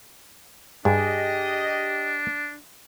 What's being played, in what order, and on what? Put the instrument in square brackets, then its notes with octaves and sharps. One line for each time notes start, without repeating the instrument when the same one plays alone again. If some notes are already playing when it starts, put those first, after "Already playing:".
[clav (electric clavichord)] G2 [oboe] D4 [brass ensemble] G4 D#5 [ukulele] G#4